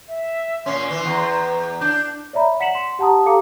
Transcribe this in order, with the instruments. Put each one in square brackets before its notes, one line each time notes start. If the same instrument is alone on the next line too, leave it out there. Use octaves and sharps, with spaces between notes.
[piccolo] E5
[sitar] A#2 C#4 [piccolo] C6
[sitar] E3
E2
[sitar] D4 [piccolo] G6
[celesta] C#5 D5 E5 A#5 B5
F#5 B6 C#7 E7 F#7
C6
G4 F#5 A5 A#5 D#6
G4 A4 F5 A#5 D6 C#7